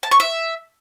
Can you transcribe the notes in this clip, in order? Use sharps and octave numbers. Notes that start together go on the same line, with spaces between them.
A5
C#6
E5